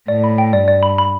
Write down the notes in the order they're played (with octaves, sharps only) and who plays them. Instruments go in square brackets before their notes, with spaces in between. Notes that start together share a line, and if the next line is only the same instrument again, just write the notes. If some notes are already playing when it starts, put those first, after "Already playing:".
[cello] A2 [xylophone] D5
[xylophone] B5
G5
[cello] G2 [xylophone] D5
[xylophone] D5
B5
B5